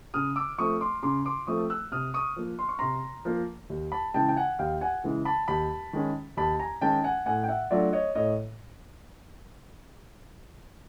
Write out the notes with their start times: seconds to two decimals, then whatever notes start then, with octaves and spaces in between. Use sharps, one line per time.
0.14 C#3 D#6 F6
0.36 D6 E6
0.58 F3 A3 C4 C#6 D#6
0.81 C6 D6
1.03 C#3 C6 D6
1.25 C6 D6
1.47 F3 A3 C4 C#6 D#6
1.70 E6 F#6
1.92 C3 D#6 F6
2.14 C#6 D#6
2.36 F3 A#3
2.59 C6
2.69 C#6
2.79 C3 A#5 C6
3.25 F3 A#3
3.70 D#2
3.92 A5 B5
4.14 C#3 E3 G#3 G5 A5
4.28 G5
4.36 F#5 G#5
4.59 D#2 F5 G5
4.81 F#5 G#5
5.04 C#3 E3 G#3
5.25 A5 B5
5.48 D#2 A5 B5
5.93 D#3 G#3 C#4
6.37 D#2 A5 B5
6.60 G#5 A#5
6.81 D#3 G#3 C#4 G5 A5
7.04 F#5 G#5
7.26 A2 F#5 G#5
7.44 G5
7.48 E5 F#5
7.71 F#3 A3 D4 F4 D5 E5
7.93 C#5 D#5
8.15 A2 C#5 D#5